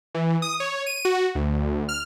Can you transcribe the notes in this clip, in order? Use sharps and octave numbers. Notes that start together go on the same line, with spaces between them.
E3
D#6
C#5
D#7
F#4
D2
F6